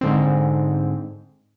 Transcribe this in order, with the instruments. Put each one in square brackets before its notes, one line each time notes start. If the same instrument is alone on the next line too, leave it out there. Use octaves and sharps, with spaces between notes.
[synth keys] G#2 D3 C4